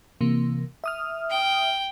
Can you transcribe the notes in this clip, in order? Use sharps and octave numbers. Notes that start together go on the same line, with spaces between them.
C3 E3 A#3
E5 D#6 F6
G5